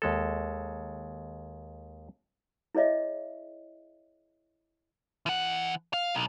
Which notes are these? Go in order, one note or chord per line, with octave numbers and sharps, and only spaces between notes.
D#2 G#3 A4
E4 G#4 C#5 D#5 E5
E3 F#5
F5
B1